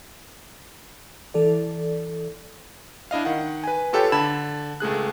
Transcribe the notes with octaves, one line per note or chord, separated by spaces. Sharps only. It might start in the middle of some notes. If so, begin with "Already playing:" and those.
E3 A4 D5
D4 E4 D#5 F5
D#3 F#5
B4 G#5
F4 G4 A4 B4 C#5 G5
D3 A5 B5 G#6 E7
C#2 A3 G#4 F#6